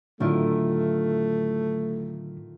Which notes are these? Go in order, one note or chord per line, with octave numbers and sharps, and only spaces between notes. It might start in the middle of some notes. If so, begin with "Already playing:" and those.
A2 D3 D#3 F#3 A3 E4 F4